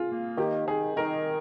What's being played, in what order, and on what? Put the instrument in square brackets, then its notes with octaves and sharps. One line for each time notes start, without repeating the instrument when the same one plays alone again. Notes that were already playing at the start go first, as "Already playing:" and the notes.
Already playing: [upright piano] F4 G#4
[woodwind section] A#3
[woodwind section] D#3 [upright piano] G4
[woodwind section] D#3 [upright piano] G#4
[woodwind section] D#3 [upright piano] A#4